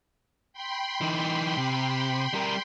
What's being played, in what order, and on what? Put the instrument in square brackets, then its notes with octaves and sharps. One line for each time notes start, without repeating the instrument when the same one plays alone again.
[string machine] G5 B5 C6
[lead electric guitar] E3 D#4
C3
G3 A#4